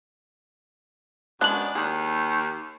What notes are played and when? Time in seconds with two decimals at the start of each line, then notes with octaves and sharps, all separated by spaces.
1.41 F#2 G#3 B3 D4 F#6 F#7
1.75 D#2 G#4